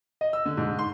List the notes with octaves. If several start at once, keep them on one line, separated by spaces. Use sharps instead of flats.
D#5
E6
D3
G#2
C6